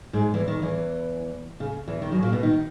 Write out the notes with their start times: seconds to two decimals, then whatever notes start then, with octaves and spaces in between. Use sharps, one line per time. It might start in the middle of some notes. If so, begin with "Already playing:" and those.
0.13 G#2 G#3
0.34 E2 E3
0.48 D#3
0.62 E2 E3
1.60 C#3
1.88 E2 E3
2.02 D#3
2.12 F#2 F#3
2.22 A#2 A#3
2.32 B2 B3
2.43 D#3 D#4